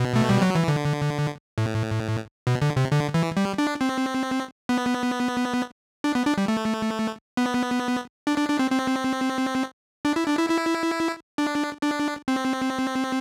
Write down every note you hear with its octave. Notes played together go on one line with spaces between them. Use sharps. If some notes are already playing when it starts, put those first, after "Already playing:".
Already playing: B2
A3
G3
F#3
E3
D3
A2
B2
D3
C3
D3
E3
G3
D4
C4
B3
D4
B3
D4
G3
A3
B3
D4
D4
D4
C4
C4
D4
E4
D4
E4
E4
D4
D4
C4